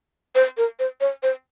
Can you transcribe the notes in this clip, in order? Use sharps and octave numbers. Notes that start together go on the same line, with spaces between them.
C5
A#4
C5
C#5
C5